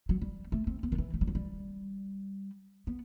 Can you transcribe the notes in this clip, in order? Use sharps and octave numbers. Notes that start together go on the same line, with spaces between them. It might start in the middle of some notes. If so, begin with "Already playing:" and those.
F#3
G3
A3
C4
B3
D#3
E3
A3
G3
F#3
G3
B3